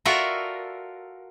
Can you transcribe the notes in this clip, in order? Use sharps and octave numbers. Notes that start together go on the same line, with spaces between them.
F4 F#4 A4 A#4 D5 E5